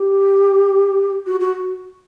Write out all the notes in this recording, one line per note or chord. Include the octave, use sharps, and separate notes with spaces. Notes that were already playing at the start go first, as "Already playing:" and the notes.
Already playing: G4
F#4
F#4